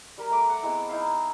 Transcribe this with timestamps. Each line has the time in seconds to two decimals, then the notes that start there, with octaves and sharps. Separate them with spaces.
0.18 G3 A#4 B5
0.30 A3 A4 D6
0.49 F#5 A#5
0.62 G#3 B3 C4 E4
0.89 D#4 E4 F5